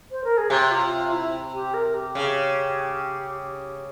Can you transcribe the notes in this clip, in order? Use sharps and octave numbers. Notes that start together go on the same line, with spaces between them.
C5
A#4
G#4
C3 G4
F4
F4
E4
G4
A#4
G4
C#3